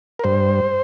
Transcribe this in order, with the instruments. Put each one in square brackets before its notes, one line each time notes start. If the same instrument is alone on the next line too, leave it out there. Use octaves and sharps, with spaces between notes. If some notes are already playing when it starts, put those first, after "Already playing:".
[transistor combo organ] A#4
G2 C5